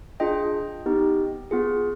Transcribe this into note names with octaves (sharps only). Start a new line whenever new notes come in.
D4 F4 G#4 D#5 G5
B3 D#4 G4
B3 F4 G#4